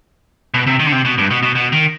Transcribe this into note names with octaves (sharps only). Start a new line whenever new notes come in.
B2
C3
D#3
D3
C3
B2
G2
B2
B2
B2
D#3